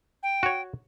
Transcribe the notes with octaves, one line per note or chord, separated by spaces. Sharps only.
G5
F#4 C#5